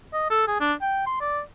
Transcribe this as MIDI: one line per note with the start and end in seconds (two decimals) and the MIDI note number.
0.13 0.28 75
0.30 0.43 69
0.48 0.56 68
0.60 0.73 62
0.81 1.05 79
1.06 1.19 84
1.21 1.40 74